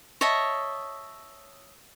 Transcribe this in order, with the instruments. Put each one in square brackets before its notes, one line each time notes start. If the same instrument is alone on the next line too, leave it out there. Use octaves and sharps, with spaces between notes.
[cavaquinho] C#5 D#5 E5 A5